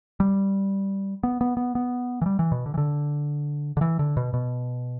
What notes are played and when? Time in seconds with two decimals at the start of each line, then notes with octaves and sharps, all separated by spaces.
0.20 G3
1.23 B3
1.41 B3
1.57 B3
1.75 B3
2.22 E3
2.26 G3
2.39 E3
2.52 B2
2.66 D3
2.74 E3
2.78 D3
3.77 D3
3.81 E3
3.99 D3
4.17 B2
4.34 B2